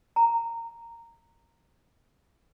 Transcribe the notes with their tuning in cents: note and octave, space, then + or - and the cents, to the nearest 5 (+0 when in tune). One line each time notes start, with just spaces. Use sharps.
A#5 -10